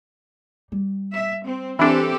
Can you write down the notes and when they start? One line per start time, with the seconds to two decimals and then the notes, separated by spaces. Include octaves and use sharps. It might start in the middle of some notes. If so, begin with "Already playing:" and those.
0.72 G3
1.13 E5
1.46 C4
1.79 E3 C4 D4 G4 A4